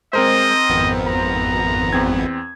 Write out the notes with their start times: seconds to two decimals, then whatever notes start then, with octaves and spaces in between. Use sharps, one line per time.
0.13 G#3 C4 A#4 C5 D#5
0.69 G#1 F2 B3
1.07 A#5
1.93 E2 C4 G#6